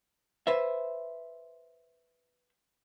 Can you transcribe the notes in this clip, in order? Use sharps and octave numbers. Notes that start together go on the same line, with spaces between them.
B4 C5 E5